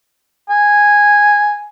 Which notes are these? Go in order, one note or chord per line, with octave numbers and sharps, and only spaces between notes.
G#5